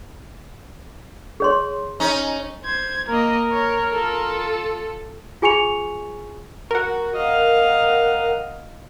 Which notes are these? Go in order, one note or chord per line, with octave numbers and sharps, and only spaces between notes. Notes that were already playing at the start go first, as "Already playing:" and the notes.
G#4 C#5 C6
C#4 D#4
C5 G#6
A#3 A#4 D#5
C#5
F4 A4
F4 G#4 G#5 C#6 C#7 F7
F#4 A#4 F#5
D#5 F5